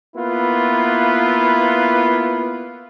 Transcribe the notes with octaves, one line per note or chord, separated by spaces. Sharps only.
A#3 B3 E4 F4 B4